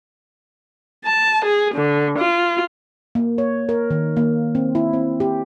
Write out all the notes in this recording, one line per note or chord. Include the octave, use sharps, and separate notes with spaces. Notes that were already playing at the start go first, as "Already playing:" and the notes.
A5
G#4
D3
F4
A#3
C#5
A#4
D#3
A#3
C4
E4
C4
G4